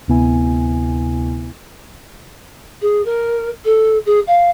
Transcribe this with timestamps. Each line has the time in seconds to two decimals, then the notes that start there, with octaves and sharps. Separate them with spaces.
0.08 D2 C3 B3 E4 G#5
2.81 G#4
3.05 A#4
3.65 A4
4.06 G#4
4.27 F5